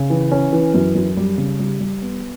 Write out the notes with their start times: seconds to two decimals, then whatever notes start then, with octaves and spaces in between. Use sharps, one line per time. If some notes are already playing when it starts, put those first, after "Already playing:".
Already playing: C#3
0.10 E3
0.32 C#4
0.53 E3
0.74 F#2
0.95 F#2
1.17 G3
1.38 C#3
1.59 G3
1.80 G3
2.02 B3